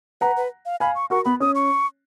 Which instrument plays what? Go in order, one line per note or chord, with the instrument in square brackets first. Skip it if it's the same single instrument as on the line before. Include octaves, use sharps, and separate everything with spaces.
[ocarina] B4 [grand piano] F#5 A#5
[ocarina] B4
F5
[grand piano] F5 G#5 [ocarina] B5
[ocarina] C#6
[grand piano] F#4 A#4 [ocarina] C#6
[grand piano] B3 [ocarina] B5
[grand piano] C#4 [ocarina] D#6
[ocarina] C#6